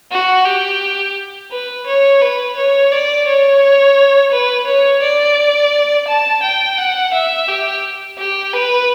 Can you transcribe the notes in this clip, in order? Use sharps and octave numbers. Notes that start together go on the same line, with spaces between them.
F#4
G4
B4
C#5
B4
C#5
D5
C#5
B4
C#5
D5
A5
G5
F#5
E5
G4
G4
B4